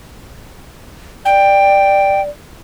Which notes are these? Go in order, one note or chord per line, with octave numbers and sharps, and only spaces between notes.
D5 G5